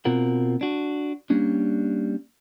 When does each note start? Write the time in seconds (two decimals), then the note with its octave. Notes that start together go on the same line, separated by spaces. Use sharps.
0.05 B2 C4 F4 A#4 F#5
0.61 D4 F#4
1.30 G3 A#3 C#4 D4